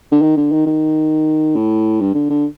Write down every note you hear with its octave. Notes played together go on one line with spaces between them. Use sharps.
D3
D#3
D3
D#3
D#3
A2
G2
D3
D3